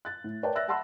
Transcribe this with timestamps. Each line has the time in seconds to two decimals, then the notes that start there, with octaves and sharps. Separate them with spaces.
0.05 F#6 A6
0.24 A2
0.43 A#4 B4 C#5 D5 G5 A5
0.55 D5 E5 E6 F#6 A6 A#6
0.68 E5 F#5 A5 B5 C6 E6